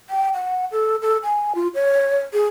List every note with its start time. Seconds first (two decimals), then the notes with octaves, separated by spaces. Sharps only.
0.10 G5
0.34 F#5
0.72 A4
1.02 A4
1.23 G#5
1.55 F4
1.75 C#5
2.33 G#4